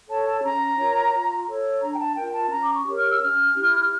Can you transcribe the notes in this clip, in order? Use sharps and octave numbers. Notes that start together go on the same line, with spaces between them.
A4 C#5 A5
A5
C#4 A#5
F4 A#4 C#5
F4
A4 C#5
D4 A#5
G5
A5
F4 A#4 G5
A5
C#4 A#5
D6
C#6
G4 A#4 C#5
F6
E6
C#4 F6
E4 G4